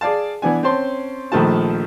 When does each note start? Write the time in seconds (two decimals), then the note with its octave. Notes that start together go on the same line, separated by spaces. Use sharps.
0.01 G#4 D5 F5 A5
0.42 E3 B3 D4 G#5
0.63 C4 C#4 A5 C6
1.32 A#1 D#3 F3 A3 F4 A5